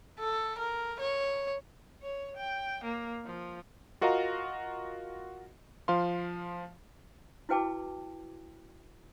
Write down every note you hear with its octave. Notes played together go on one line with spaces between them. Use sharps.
A4
A#4
C#5
C#5
G5
A#3
F3
F4 F#4 A#4 D#5 F5 A#5
F3 F5 C6
E4 F#4 B4 G5 A5 D6